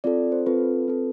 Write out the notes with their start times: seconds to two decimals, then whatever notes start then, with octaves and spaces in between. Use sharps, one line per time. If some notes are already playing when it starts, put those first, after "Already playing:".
0.04 C4 F4 A4 D5
0.32 C5
0.46 C4 F4 A4 B4
0.88 C4 F4 A4